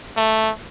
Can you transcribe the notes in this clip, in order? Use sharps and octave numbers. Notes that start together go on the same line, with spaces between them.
A3